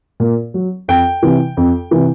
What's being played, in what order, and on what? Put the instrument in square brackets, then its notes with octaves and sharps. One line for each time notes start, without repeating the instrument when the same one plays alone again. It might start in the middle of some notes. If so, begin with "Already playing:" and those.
[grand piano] A#2
F#3
F2 G5
C3 E3
F2
C3 E3